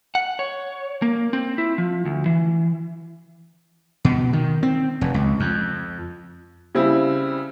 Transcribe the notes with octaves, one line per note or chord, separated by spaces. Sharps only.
F#5
C#5
A#3
C4
E4
F3
D2
E3
B2
D#3
C4
F1
C#2
F2
C#3 G3 C4 E4